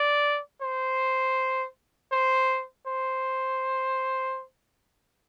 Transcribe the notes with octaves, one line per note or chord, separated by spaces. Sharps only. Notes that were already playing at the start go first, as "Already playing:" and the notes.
Already playing: D5
C5
C5
C5